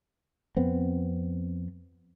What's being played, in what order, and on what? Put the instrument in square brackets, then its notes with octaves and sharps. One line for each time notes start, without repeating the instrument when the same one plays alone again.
[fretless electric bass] F2 B3 C4